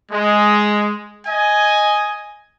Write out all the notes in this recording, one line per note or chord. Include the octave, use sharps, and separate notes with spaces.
G#3
D#5 G#5